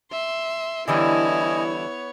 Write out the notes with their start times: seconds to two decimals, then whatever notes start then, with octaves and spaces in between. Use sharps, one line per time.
0.12 E5 C6
0.88 D3 E3 G3 B3 E4 C#5 D#5 G#5